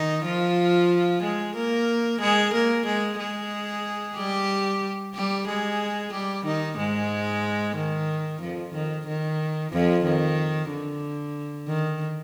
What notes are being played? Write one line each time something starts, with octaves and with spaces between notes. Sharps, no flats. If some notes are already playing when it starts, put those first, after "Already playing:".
Already playing: D#3 D#4
F3 F4
G#3 G#4
A#3 A#4
G#3 G#4
A#3 A#4
G#3 G#4
G#3 G#4
G3 G4
G3 G4
G#3 G#4
G3 G4
D#3 D#4
G#2 G#3
D#3
F2 F3
D#3
D#3
F2 F3
D#3
D3
D#3